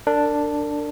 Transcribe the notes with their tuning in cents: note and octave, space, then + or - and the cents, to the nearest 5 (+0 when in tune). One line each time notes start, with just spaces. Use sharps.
D4 +0 A#4 -40